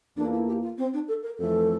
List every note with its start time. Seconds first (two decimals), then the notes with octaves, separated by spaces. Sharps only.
0.16 E2 E3 A#3 D4 F4 A4
0.32 E4
0.47 G4
0.62 F4
0.77 C4
0.93 D4
1.08 A4
1.22 A#4
1.38 F2 E3 A3 A4